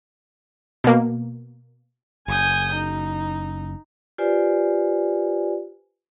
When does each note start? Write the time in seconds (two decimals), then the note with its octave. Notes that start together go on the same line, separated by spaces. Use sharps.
0.84 B2 A#3
2.28 F#1 G#5 D#6 G6
2.75 D#4
4.18 F4 G4 B4 C5 D5 G#5